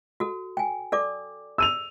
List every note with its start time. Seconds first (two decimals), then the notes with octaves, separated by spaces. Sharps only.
0.20 F#4 A4
0.57 G5 G#5
0.92 A4 D5 D6
1.58 E6 D#7 F7